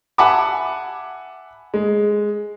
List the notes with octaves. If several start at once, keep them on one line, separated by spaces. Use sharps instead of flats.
E5 F#5 G#5 A5 B5 D6
G#3